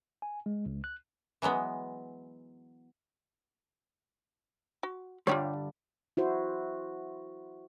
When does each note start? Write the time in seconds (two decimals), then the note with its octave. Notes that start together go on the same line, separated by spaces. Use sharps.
0.22 G#5
0.46 G#3
0.66 C#2
0.84 F#6
1.42 E3 F#3 G#3 B3
4.83 F#4
5.27 G2 D3 G3 F4 G4 C#5
6.17 E4 F#4 C5